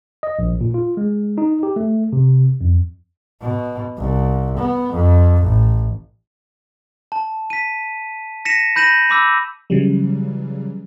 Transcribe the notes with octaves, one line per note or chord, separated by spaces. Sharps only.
D#5
A#1
A#2
F4
G#3
D#4
G4
A3
C3
F2
B2
C2
B3
F2
A1
A5
B6 D#7
A#6 B6 C#7 D#7 E7
B5 G6 A#6 D#7 E7 F#7
B5 D6 E6 G6
C#3 E3 F#3 G3